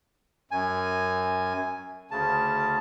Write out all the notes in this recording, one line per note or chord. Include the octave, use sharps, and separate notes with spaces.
F#2 G#5
D2 C#3 A5